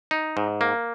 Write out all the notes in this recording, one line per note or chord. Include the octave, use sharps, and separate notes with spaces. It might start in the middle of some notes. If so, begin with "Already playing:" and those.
D#4
G#2
A#3